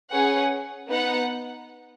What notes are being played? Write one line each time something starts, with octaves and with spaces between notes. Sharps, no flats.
C#4 G#4 B4 F#5
B3 D#4 B4 F#5